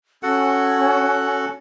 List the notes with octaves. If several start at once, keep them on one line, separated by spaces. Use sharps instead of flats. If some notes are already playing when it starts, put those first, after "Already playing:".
C#4 F#4 A4 F#5